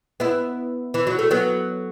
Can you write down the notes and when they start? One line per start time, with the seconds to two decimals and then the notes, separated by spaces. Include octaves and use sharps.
0.20 B3 E4
0.94 E3
1.07 F#3
1.19 A3
1.31 F#3 B3